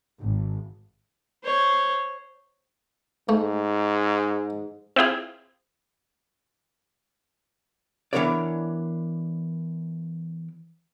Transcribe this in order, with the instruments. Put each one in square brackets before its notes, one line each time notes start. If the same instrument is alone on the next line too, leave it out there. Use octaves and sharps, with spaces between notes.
[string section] G#1
[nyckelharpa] C5 C#5
[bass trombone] G#2 [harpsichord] A3
[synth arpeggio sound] C4 E4 F4 G#4
[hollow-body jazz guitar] E3 B3 D4 A#4 C#5 D5